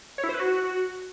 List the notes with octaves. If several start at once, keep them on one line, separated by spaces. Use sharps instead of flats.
C#5
E4
C5
B4
F#4